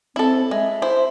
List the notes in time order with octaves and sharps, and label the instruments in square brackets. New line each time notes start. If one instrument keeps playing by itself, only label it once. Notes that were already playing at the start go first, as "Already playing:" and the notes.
[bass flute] C4 [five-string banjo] E4 A4
[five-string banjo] G#3 [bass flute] E5
[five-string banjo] E4 C5